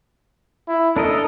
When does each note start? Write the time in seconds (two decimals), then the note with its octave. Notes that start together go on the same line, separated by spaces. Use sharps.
0.68 E4
0.96 D4 A4 A#4 D#5